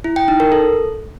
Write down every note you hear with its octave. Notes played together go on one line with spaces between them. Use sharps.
E4
G5
D#4
A#4
A4